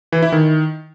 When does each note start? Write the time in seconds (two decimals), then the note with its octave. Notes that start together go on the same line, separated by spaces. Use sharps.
0.12 E3
0.22 E4
0.32 D#3